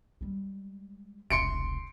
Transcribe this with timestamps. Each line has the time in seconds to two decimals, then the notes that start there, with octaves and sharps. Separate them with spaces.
0.21 G3 G#3
1.30 E1 C2 C6 C#7 D7